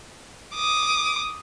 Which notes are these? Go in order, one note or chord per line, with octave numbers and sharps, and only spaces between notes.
D6 D#6